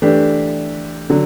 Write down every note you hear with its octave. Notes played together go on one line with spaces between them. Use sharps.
E3 A3 D4 G4
D3 F#3